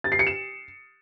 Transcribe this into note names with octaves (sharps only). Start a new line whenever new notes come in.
A6
C7
C#7
E7